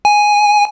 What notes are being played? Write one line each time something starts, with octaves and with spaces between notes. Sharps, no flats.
G#5